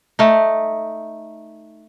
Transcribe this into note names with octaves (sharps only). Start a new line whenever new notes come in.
A3 D#4